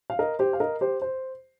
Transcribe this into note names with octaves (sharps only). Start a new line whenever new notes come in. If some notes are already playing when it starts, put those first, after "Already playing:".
F5
A#4 D#5
G4 C5
F5
A#4 D#5
G4 C5
C5